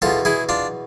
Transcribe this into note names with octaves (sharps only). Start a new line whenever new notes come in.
E2 B2 F4 A4
E4 G#4
D4 F4